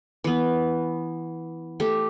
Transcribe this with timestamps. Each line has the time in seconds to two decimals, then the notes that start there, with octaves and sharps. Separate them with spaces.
0.24 E3 B3
1.80 A3 G4